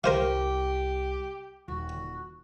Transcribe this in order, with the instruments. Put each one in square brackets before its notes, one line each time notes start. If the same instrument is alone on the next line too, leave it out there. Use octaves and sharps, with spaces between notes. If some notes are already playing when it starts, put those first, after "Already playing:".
[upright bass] C2 [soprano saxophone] G4 [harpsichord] A#4 C5 F5
[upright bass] D#1 [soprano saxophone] F#4